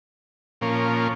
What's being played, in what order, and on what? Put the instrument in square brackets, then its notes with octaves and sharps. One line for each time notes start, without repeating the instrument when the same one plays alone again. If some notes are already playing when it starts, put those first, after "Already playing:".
[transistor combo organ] A#2 F3 A#3 C#4